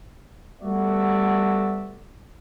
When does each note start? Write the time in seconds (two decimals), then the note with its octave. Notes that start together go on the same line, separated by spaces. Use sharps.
0.62 G3 A3 B3 F#4 D5 E5